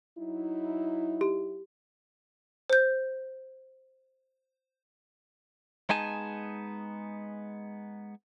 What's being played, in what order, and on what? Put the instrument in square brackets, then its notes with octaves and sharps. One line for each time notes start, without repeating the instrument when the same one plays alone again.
[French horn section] F#3 D#4 E4
[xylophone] G4
C5 G6
[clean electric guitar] G#3 B3 D#4 G#4 G#5 A5